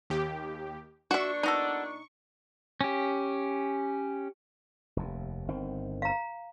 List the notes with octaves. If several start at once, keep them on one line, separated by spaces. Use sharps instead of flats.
D#2 G4
A#2 D4 F#4 E5 C#6
B3 D#4 F#4 A4
C#4 G4
F1 D#2
G1 D#3 C4
F5 A#5